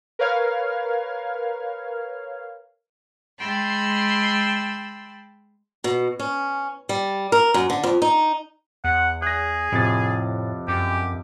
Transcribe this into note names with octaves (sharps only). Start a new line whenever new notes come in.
A#4 B4 C#5 F5 F6 G#6
G#3 G5 A5 B5 C6 E6
B2
C#4
G3
A#4
F#2
D3
F2
D#4
E2 F#5
G#4 F#6 A#6
F2 A2 C3 A6
F#2 G4